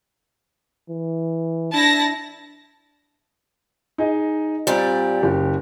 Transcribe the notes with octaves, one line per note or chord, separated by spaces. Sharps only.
E3
D4 E4 A5 A#6
D#4 G#4 D#5
A#2 G3 C4
F#1 F#4 G4